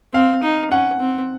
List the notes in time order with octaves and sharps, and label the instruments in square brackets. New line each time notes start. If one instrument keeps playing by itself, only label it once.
[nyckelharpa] C4 [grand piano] F5
[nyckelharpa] D#4
[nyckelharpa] C#4 [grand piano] F#5
[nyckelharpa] C4